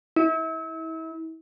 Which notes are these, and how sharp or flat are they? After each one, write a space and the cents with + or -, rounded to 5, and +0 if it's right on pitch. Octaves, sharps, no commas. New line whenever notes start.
E4 -35